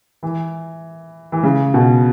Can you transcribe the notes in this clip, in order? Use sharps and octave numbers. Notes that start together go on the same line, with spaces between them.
E3
E3
C#3
B2